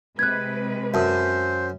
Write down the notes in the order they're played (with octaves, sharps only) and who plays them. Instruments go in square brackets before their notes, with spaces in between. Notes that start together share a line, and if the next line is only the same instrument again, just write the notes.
[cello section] C3 G#3 B4 [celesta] F#6 G#6
[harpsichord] F#2 [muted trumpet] C5 [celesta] E5 A5 D#6